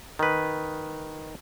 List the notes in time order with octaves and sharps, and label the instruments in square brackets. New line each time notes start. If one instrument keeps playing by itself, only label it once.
[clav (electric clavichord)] D#3 B4